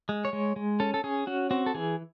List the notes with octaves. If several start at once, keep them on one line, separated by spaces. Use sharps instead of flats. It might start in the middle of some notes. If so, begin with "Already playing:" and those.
G#3
C#5
G#3
G#3
C#4 A4
A4
C#4 G#4
C#4 F#4
C4 F#4
A4
E3 G#4